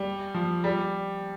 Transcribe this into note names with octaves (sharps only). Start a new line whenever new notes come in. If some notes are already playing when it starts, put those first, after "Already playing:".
Already playing: G3
F3
G3